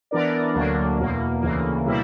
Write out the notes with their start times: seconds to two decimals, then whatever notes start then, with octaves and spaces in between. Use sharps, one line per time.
0.11 E3 B3 D4 A#4 D5
0.54 D2 D3 F#3 A#3 D4
0.99 E2 B2 A#3
1.42 D2 C#3 E3 A#3
1.86 B2 G3 A#3 E4